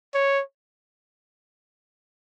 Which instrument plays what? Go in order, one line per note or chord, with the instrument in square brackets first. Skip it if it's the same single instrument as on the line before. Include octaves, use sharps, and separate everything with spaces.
[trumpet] C#5